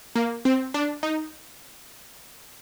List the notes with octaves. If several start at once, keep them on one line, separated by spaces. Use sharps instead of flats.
A#3
C4
D4
D#4